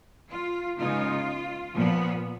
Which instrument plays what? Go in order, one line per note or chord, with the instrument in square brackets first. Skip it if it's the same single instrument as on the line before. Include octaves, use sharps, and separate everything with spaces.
[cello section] F4
C#3 G#3 B3 D#4 F4
A#2 F3 B3